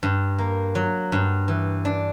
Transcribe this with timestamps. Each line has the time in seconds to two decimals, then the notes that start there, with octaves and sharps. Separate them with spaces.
0.03 G2
0.38 A#3
0.75 F#3
1.12 G2
1.48 E3
1.85 D4